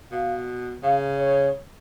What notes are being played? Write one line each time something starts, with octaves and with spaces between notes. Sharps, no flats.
B2 F5
C#3 F5
C#5